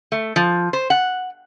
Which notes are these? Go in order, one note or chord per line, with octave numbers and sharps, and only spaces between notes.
A3
F3
C5
F#5